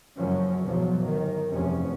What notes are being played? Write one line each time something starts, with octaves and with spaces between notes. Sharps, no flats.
F#1 F#2 F3 F#3 C#4
B1 E2 G#2 F3 F#3
G1 D#3
F1 E2 G2 C3 F3 C#4